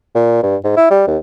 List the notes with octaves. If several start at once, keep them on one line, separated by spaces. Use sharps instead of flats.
A#2
G2
G#2
E4
G3
D#2